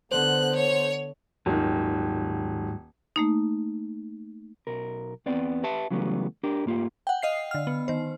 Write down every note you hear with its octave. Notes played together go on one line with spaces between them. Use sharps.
D3 B3 C5 F#6
C#5
D#1 G#2 D#3 F#3
A3 A#3 D#4
B1 A#4
E2 B3 C4 D5
G4 B4 E5 A5
C#3 E3 F#3 G3 A3 B3
D4 G4 A#4
G#2 A#3 F4 G4
F#5 G5
D#5 F5 C7
D3 F6
B3
D#3 C5